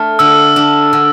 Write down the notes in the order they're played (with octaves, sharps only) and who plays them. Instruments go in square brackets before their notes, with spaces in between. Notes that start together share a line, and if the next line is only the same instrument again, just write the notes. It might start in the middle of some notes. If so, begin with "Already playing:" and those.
Already playing: [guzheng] A3 D4 [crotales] F6
[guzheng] D3 [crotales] E6
[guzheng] D4
D3